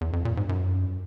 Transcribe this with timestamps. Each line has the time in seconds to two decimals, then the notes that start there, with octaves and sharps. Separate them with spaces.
0.01 E2
0.13 F2
0.25 A#2
0.37 G#2
0.49 F#2